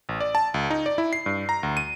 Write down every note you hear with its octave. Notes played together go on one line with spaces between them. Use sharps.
A1
D5
A5
C#2
D#4
D5
E4
C7
G2
A#5
D2
D#7